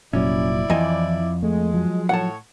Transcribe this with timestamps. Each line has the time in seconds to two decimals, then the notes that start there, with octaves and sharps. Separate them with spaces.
0.13 F1 A#2 F#3 C#4 E4 D5
0.70 F2 E3 D#5 G#5
1.43 G#3 A3
1.74 F3 F#3
2.09 A2 C#5 F#5 A5